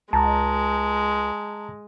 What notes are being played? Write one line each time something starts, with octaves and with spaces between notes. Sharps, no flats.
C#2 G#3 A5 A#5